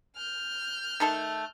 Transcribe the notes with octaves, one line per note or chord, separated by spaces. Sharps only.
F6 G6
D#3 A3 A4